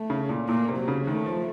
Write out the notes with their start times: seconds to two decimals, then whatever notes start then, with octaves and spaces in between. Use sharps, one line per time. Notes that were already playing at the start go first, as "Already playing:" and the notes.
Already playing: A3
0.10 C#3
0.29 A#2
0.48 A#2 A#3
0.69 C3
0.78 F#3
0.88 C#3
1.07 D#3 A3
1.26 F3